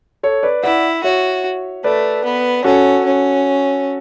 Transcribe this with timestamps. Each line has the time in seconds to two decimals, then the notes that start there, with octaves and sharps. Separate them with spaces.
0.23 A4 C#5
0.43 B4 D5
0.63 E4 D5 F#5
1.04 F#4 C#5 E5
1.84 A3 B4 D5
2.24 B3
2.64 C#4 F#4 A4
3.05 C#4